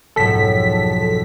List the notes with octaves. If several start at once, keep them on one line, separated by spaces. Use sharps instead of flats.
B1 F2 G#2 A4 B6